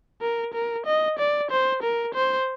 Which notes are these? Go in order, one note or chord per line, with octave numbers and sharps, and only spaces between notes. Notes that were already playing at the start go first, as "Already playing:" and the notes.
A#4
A#4
D#5
D5
C5
A#4
C5